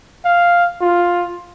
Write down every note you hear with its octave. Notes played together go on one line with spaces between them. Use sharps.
F5
F4